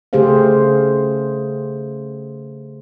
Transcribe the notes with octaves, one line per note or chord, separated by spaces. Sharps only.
C#3 A3 G4 G#4 C5 F5